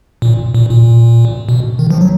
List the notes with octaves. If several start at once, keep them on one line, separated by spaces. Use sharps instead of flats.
A#2
A#2
A#2
B2
D#3
F3
F#3